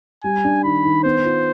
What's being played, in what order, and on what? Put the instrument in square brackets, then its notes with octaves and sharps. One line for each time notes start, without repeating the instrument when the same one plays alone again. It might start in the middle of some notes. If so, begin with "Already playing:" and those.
[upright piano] G3 [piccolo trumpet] G#5
[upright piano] D4
[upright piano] D#3 [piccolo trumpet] B5
[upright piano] D#3
[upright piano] B3 [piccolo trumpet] C5
[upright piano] F4